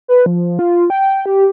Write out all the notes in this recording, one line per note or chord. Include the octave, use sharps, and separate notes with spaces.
B4
F3
F4
G5
G4